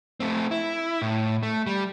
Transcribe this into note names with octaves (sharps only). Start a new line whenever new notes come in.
A3 C4
E4
A2
A3
G3